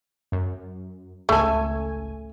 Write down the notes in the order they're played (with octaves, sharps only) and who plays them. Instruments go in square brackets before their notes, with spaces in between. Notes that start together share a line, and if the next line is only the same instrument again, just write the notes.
[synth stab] F#2
[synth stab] G#1 C#2 G#5 [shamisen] A3 A4